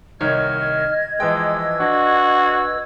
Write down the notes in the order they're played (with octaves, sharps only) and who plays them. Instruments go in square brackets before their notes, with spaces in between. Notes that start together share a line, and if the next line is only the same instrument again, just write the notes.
[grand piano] C2 D#3 C#5 [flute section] D#5 G#6 [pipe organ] F6
[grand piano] E3 F3 G5 [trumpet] G#3 [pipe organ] B4 E6
[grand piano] D4 [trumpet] F#4